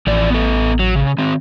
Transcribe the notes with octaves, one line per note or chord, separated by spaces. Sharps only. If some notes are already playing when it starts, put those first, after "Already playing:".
A1 E3 F3 D5
B3 A4
F#3
C#3
D#3 C4